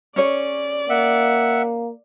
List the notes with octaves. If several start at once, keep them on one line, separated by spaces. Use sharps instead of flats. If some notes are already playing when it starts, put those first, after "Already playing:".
C#4 G#4 C#5 D5
A#3 E5 F#5